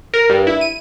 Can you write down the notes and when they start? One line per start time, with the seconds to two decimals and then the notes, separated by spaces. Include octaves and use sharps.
0.14 A#4
0.29 G2
0.47 E4
0.61 D#7